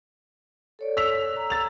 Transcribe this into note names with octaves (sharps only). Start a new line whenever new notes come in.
A4 C#5 D5
E6 B6 F7
A#5
E6 A6 F7